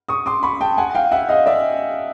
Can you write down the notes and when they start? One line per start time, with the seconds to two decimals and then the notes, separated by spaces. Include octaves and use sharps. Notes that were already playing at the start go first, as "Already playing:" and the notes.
0.09 C#6 D#6
0.26 C6 D6
0.43 B5 C#6
0.61 G5 A5
0.78 F#5 G#5
0.95 F5 G5
1.11 E5 F#5
1.29 D#5 F5
1.46 D5 E5